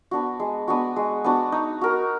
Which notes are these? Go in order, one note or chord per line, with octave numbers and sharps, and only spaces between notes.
B3 D4 F#4
G#3
B3 D4 F#4
G#3
B3 D4 F#4
D#4
F#4 A#4